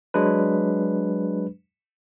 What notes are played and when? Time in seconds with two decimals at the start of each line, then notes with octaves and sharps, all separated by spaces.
0.14 F#3 G#3 D4 B4